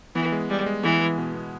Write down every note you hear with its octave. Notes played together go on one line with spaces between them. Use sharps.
E3 B3
G#3
G3 G#3
G#3
E3 B3
G#3
B2
B3